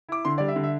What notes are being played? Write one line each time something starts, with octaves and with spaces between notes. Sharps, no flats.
E4 D6
D3 C6
G3 D5
E5
D3
E5